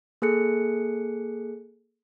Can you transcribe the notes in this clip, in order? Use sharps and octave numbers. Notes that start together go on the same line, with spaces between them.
A#3 G#4 A4 F#6 C#7